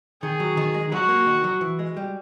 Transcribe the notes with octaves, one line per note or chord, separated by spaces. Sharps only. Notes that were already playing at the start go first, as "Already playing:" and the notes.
D#3 G#4
F#3
D#3
G#3
F#3 F#4
A#3
D#3
F#3
E3
G#3
G3